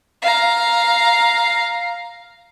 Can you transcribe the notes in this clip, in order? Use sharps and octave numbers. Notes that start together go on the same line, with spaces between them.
F5 A#5